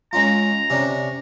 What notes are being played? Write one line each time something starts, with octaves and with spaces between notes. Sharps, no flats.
G#3 C#4 F4 A#5
C3 C#4 D4